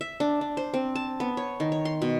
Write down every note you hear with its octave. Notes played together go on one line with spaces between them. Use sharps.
E5
D4
D4
C5
C4
A5
B3
C#5
D#3
C#5
C6
B2